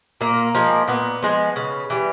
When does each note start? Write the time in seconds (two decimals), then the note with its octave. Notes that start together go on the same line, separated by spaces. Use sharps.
0.21 A#2 A#3
0.55 F3 G#3
0.88 A#2 B3
1.23 F3 G#3
1.56 C#3
1.90 E3 G3